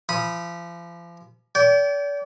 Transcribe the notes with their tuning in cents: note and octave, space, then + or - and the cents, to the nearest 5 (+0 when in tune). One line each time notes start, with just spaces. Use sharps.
F3 -35 B5 -20 D#6 +0
D5 -40 G5 -5